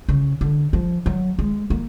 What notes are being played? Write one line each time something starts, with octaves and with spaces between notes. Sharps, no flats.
C#3
D3
F3
F#3
G#3
A#3